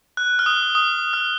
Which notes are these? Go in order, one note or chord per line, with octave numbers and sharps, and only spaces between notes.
F#6
F6
D#6
D#6
F6